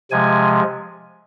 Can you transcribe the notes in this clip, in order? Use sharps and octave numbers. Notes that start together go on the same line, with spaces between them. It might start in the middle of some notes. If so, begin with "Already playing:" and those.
C3 F3 G#3 G#5